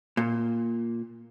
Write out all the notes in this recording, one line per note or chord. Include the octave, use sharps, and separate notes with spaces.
A#2